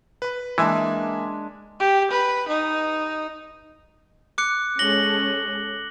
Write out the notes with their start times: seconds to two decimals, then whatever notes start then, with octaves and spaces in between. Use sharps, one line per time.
0.22 B4 B5
0.58 E3 G#3 A#3 D4 E5 G#5
1.80 G4
2.11 B4
2.48 D#4
4.38 D6 F#6 C#7
4.79 G#3 C#4 A4 A#6 F#7 G7